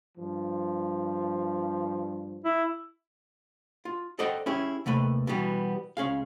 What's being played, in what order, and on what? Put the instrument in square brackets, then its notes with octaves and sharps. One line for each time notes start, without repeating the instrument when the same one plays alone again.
[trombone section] G2 F3
[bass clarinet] E4
[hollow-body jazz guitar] F4
A4 C5 D5 D#5 F#5 G5
C#4 E4 G4 G#4
D#2 C3 A3 B4
B2 E3 G3 B3
C#2 C#4 G#4 F5